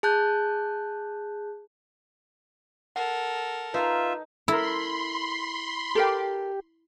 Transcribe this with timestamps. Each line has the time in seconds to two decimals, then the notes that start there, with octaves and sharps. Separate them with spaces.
0.03 G#4 A5 F#6 G6
2.96 A4 A#4 F#5
3.74 D#4 F4 B4 E5
4.48 E4 A4 A#4 B5 C6
5.95 G4 A4 A#4 G5